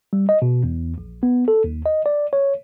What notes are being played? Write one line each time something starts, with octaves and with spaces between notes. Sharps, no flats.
G3
D#5
B2
E2
A#1
B3
A4
D#2
D#5
D5
C#5